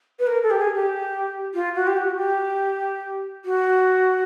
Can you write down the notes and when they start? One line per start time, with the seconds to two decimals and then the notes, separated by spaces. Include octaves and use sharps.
0.19 B4
0.27 A#4
0.43 A4
0.51 G4
0.59 G#4
0.75 G4
1.54 F4
1.75 F#4
1.87 G4
1.97 F#4
2.18 G4
3.45 F#4